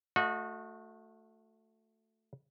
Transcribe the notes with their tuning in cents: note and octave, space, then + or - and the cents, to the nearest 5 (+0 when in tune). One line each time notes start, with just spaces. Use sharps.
A3 +5 F#4 -30 D#5 -15